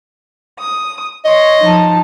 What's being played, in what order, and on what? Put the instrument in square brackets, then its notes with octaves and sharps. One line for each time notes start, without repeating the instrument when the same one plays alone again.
[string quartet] D#6
[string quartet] C#5 C6 [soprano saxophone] D#5
[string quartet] F3 D#4 A5